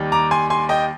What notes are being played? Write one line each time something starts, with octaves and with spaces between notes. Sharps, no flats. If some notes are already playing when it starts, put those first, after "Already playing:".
Already playing: D#2 D#3 G3
A#5 D6
G#5 C6
G#5 C6
D#5 G5